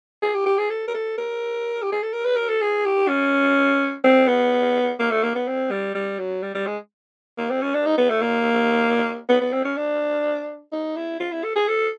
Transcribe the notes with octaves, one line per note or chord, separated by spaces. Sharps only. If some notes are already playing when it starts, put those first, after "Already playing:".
G#4
G4
G4
G#4
A4
A#4
A4
A#4
G4
G#4
A4
A#4
B4
A#4
A4
G#4
G4
C#4
C4
B3
A#3
A3
A#3
B3
C4
G3
G3
F#3
G3
G3
G#3
A#3
C4
C#4
D4
D#4
B3
A3
A#3
B3
B3
C4
C#4
D4
D#4
E4
F4
E4
A4
G#4
A4